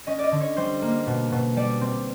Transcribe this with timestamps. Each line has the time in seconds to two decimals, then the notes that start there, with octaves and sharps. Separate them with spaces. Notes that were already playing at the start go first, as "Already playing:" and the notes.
0.07 C#4 D#5
0.19 D5
0.24 D#5
0.32 D3
0.41 C#5
0.57 G3 C5
0.82 A#3
1.07 B2
1.32 B2
1.57 G3 D5
1.81 C4